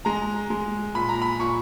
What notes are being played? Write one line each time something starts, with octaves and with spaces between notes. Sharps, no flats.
G#3 A#5
G#3
A#2 B5
A#5
B5
A#2 C#6